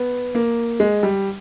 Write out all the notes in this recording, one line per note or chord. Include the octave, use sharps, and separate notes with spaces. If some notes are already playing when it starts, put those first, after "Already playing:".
Already playing: B3
A#3
G#3
G3